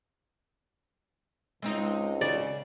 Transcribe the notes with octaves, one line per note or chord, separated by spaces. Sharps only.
C#2 G#3 C4 D#4
C#3 D5